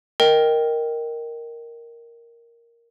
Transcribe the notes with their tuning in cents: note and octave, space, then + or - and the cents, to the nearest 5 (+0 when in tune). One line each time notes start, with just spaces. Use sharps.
A#4 +0 D#5 +0 G5 +0